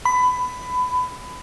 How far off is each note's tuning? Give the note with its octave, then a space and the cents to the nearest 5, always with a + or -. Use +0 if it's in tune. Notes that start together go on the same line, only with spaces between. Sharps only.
B5 +20